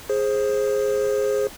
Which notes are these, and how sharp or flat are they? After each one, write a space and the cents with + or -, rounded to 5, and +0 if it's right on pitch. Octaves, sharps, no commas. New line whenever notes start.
G#4 +0 C5 +20